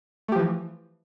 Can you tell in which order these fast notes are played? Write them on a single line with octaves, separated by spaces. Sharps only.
A3 G4 F3 E3